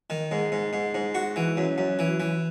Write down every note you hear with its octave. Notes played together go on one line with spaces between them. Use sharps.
D#3
G#2
G#2
G#2
G#2
F#4
E3
F#2
F#2
E3
E3